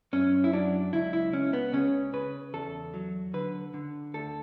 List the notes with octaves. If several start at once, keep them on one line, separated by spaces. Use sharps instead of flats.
F#2 C#4
E4
F#3 D4
C#2 E4
E4
C#2 C#4
B3
C#3 C#4
C#3 B4
E2 A4
F#3
D3 B4
D3
D2 A4